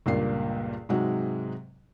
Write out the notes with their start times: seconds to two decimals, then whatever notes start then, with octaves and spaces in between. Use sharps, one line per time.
0.06 C#2 G2 A#2 A#3 D5 C7
0.89 G#2 C3 F#3 G#3 F#4